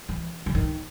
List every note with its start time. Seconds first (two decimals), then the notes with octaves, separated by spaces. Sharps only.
0.09 E3
0.46 D3
0.55 D#3